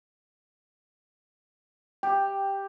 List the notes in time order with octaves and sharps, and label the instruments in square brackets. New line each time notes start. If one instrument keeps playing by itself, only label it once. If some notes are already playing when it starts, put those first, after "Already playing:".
[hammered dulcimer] G4 [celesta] G5